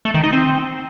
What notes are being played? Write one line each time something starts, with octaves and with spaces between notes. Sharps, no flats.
A3
D#3
D#4
C4